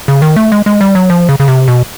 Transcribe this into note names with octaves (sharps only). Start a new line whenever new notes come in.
C#3
D#3
A3
G#3
G#3
G3
F#3
F3
C#3
C#3
C3
B2